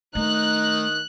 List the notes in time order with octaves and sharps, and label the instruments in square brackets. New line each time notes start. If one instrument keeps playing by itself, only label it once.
[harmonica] D#3 D#4 [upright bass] A3 [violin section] F#6